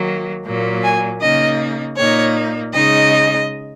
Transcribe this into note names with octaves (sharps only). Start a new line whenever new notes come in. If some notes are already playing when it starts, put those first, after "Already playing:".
Already playing: D#3 F#3 A#3
A#2 F#3 A#3
G#5
C#3 A#3 D#4 D#5
A#2 A#3 D#4 C#5
C#3 G#3 D#4 D#5